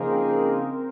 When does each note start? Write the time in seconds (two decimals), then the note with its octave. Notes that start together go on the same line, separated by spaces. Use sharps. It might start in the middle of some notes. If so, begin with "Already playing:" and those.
Already playing: C#3 F3 A#3 D#4 G#4 A#4 C5
0.10 C4
0.27 C4